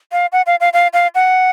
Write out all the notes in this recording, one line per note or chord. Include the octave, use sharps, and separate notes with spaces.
F5
F#5
F5
F5
F5
F5
F#5